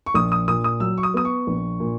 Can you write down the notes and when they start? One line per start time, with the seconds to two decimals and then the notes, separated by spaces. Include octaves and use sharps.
0.06 C#6
0.14 A#1 D#6
0.32 D#6
0.47 A#2 D#6
0.64 D#6
0.80 F#3 E6
0.98 C#6
1.03 D#6
1.14 B3 D#6
1.25 C#6
1.47 A#1
1.80 A#2